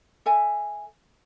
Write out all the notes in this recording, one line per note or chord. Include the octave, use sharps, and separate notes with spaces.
A4 E5 G#5